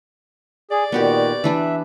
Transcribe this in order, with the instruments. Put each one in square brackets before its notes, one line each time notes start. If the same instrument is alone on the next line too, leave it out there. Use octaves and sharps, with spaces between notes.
[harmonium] G#4 [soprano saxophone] D5
[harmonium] A#2 D#3 [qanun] B3 F#4 G4
[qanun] E3 D4 B4 [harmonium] E5